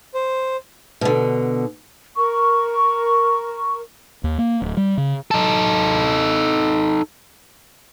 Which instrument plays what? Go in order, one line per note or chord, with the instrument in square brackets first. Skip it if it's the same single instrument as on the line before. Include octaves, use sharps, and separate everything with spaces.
[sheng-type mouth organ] C5
[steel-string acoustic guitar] B2 D3
[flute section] A#4 C#6
[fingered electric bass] D#2
A#3
D1
G3
C#3
[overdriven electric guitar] D#4 A4